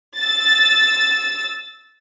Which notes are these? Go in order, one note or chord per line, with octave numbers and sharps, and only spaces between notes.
E6 A6